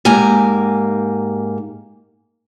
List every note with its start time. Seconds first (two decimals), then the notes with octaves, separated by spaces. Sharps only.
0.05 G#2 A#3 G4 G#5 A#5